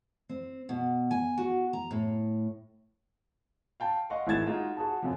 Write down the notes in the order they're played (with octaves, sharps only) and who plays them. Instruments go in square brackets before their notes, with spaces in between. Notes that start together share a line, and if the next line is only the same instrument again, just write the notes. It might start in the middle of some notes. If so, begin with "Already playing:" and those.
[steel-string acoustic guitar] C4
B2
G#5
F#4
A#5
A2
[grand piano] F5 G5 A5
D#5 F5 F#5 C6 C#6
G#1 E4 G#4 G#6 A6 E7
G#3 D#4 F4 F#4
F#4 G#4 A5
F#2 C3 F3